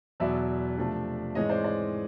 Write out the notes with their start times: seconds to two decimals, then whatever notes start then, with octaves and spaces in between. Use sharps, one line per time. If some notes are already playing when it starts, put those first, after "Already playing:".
0.20 E2 B2 F#3 B3 D5 E5
0.78 C3 F3 A3 D4
1.35 G#2 E3 G#3 C4 C#5 D#5
1.49 C5 D5
1.64 C5 D5